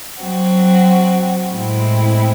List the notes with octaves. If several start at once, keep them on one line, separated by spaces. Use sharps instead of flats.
F#3 C4 F#4
A2 G#3 C4 E4